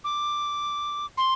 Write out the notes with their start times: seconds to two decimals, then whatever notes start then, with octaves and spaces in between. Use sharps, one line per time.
0.04 D6
1.18 C6